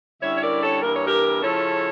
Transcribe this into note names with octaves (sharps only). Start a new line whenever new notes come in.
D3 G3 C#4 E4 C#5 E5
C#5
A#4 D5
A4 C#5
G2 E3 A#3 A#4
C#5
G4 A#4
C#3 F3 C#4 E4 A4 C#5